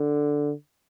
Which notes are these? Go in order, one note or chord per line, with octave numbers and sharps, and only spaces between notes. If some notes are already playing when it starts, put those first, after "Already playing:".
Already playing: D3